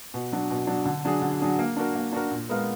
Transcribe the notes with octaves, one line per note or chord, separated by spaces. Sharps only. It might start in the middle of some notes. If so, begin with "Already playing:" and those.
B2
F#3 D4
B2
F#3 D4
D3
F#3 D4 G#4
D3
F#3 D4 G#4
A#3
D4 F#4 A#4
A#3
D4 F#4 A#4
A#2
G#3 B3 F4 A#4